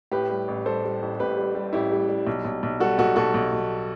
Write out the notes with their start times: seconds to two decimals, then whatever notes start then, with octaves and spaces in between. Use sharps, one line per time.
0.12 A2 G4 B4
0.30 G3
0.48 A1
0.66 G3 A4 C5
0.84 G3
1.02 A1
1.19 A1 G4 B4
1.37 G3
1.55 G3
1.73 A1 E4 G4
1.92 G3
2.09 G3
2.27 B1
2.45 B1
2.63 B1
2.80 G3 F#4 A4
2.98 B1 F#4 A4
3.16 B1 F#4 A4
3.34 B1
3.52 B1